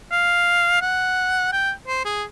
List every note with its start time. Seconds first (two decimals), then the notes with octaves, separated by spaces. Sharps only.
0.12 F5
0.82 F#5
1.53 G5
1.87 C5
2.05 G#4